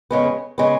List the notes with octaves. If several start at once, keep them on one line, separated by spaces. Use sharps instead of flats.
F2 C#3 G#3 B3
C#3 G#3 B3